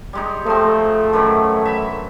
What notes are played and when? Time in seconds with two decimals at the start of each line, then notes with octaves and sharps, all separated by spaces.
0.13 G3 G#3 D#4
0.46 F3 A3 C4
1.13 F#2 D#3 E3
1.65 E5 B5